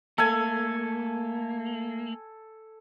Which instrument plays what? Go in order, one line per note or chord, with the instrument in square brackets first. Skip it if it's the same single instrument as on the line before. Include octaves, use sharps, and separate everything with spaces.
[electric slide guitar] A3 A#3 [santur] A4 G#5